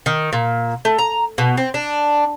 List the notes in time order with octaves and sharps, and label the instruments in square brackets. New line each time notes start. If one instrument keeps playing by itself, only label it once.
[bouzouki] D#3
A#2
A3
A#5
B2
C4
D4